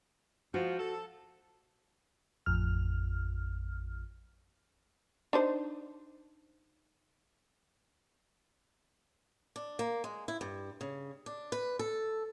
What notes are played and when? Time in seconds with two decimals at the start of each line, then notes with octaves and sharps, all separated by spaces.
0.54 G#2 F3 F#4
0.80 A4
2.46 A1 F2 F6
5.33 D4 D#4 C5
9.56 D4
9.79 A#3
10.04 G#3
10.28 E4
10.41 G2
10.81 C#3
11.26 D4
11.52 B4
11.79 A4